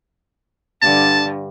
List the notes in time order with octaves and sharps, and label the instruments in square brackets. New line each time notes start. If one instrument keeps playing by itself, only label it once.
[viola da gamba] G2 D3 [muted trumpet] A5